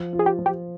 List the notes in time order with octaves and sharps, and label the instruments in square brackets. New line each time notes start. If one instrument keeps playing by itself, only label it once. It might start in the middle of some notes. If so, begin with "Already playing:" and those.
Already playing: [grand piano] F3
F4
[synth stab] G#4
G4
[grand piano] F3
[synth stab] G4